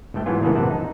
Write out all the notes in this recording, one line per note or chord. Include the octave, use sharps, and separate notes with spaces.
G1 D2 A3 G5
G#2 E3 F#3 B3 F4 G#5
E2 A2 C#3 E3 A#3 B3
A#1 F#2 C3 E3 F#5 A5
D#4